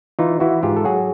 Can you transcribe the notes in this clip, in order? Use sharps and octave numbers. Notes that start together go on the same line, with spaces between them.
E3 D#4 F4
E3 E4 F#4
G#2 F4 G4
A4
F#3 F#4 G#4